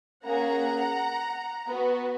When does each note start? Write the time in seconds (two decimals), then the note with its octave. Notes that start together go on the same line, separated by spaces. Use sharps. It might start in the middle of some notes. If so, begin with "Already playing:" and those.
0.25 A#3 C#4 G#4 F#5 A#5
1.68 B3 F#4